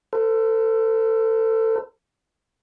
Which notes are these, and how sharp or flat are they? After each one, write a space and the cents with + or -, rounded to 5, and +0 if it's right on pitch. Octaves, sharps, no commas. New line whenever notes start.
A4 +25 C5 -40